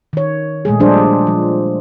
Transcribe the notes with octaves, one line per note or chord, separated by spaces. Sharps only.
D#3 C#5
A#2 G#3 A3 G#4
F3 G3 D4 G#4 C5
F3